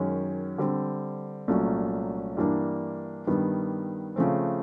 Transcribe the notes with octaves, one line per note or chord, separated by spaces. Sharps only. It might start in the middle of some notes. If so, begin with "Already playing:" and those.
Already playing: F#2 D#3 G#3 C#4
D3 G3 C4
C2 A#2 F#3 A3 C#4
G2 E3 G3 A#3 D4
G2 D#3 G3 B3
C#3 F3 A3 C4